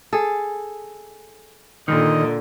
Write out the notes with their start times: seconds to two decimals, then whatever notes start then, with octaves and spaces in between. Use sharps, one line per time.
0.13 G#4 A4
1.88 A#2 D3 D#3 D#5